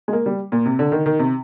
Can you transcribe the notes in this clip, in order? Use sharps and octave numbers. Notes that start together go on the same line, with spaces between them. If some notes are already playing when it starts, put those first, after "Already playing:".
G#3
A#3
G3
A#2
C3
D3
D#3
D#3
C3